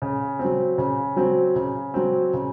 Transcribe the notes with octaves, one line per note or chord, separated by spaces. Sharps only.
C#3
C4
F#3
C#3
F#3 C4
C#3
F#3 C4
C#3